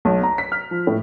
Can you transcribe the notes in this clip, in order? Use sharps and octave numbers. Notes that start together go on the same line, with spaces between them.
B1
A#5
B6
F6
F3
A2